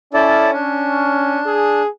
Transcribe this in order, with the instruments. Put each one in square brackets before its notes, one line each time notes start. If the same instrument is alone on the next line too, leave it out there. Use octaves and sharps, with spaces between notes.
[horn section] C#4 [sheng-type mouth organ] E4 A4 D5
[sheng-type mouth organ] D4
[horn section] G#4